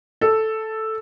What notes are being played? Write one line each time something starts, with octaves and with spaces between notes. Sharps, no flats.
A4